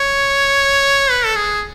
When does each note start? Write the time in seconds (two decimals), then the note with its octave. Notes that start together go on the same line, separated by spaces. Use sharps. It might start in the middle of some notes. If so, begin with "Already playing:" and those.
Already playing: C#5
1.10 B4
1.25 A4
1.35 G#4